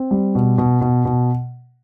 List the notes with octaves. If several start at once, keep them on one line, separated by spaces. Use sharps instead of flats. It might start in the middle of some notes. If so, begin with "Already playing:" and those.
Already playing: C4
G3
B2
B2
B2
B2